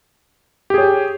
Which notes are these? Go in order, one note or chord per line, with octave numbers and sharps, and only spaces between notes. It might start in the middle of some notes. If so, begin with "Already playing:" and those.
G4 G#4 C#5